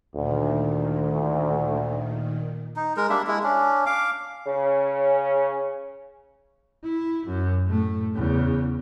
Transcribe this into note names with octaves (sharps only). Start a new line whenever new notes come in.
D2 A#2 D#3
D#4
G#3 A#4
G3 A#3 D4 E5
G#3 E4
C#4 D4
F5 D6
C#3 C#4
E4
F#2
A2 A3
E2 C#3